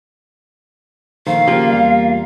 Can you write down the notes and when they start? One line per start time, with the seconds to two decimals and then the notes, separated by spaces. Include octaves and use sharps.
1.27 A#1 D#3 A3 C5 F5
1.48 C#3 F3 A#3 F4 G4
1.70 E2 G3